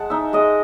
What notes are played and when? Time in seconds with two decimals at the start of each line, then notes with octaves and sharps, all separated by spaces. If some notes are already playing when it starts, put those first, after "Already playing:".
Already playing: G#3 F#5 A5
0.10 D#4 E5
0.33 G#3 D#5